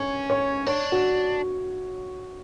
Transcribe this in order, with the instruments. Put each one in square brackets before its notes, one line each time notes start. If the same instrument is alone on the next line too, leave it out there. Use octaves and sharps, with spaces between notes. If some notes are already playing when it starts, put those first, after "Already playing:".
Already playing: [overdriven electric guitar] C#4 [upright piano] C#5
[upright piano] C#5
[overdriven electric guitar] D4 [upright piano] C#5
[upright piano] F#4